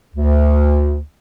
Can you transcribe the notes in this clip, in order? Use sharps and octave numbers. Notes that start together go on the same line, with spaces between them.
D2